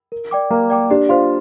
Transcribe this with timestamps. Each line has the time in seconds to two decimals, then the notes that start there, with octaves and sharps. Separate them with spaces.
0.12 A#4
0.31 D5 G5 D6
0.50 A#3 A#4
0.70 D5 G5 D6
0.90 D4 G4
1.09 F4 C5 F5 C6